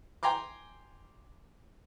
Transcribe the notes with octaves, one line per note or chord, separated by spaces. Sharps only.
G5 G#5 A#5 C6 D6